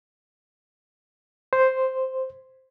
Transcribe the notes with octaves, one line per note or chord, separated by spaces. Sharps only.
C5